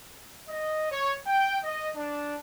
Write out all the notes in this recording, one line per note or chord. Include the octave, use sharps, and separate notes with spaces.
D#5
C#5
G5
D#5
D4